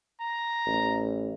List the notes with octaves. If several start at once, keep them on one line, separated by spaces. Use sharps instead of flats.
A#5
A1